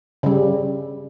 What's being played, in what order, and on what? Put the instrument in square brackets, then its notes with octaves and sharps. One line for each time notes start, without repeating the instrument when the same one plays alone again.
[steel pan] C#3 G3